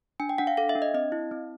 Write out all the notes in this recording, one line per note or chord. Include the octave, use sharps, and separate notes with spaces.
D4 G#5
G5
D4 F#5
F5
A4 F5
E5
D4
D#5
C4 D#5
E4
C4